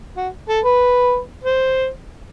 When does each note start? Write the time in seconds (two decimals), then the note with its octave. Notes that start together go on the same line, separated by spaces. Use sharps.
0.17 F#4
0.49 A4
0.65 B4
1.43 C5